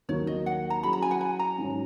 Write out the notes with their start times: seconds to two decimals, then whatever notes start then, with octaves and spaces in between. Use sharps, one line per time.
0.09 D#2 D#3 F#3 A#3 C#5
0.27 D#5
0.46 F#5
0.70 A#5
0.83 F#3 C#4 E4 G#4 B5
0.93 A#5
1.02 G#5
1.11 F#5
1.21 G#5
1.39 A#5
1.58 G#2 D#3 F#3 C#4